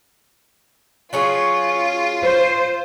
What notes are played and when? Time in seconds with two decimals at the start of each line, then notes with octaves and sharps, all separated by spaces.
1.13 F#3 C#4 F4 G#4
2.24 C5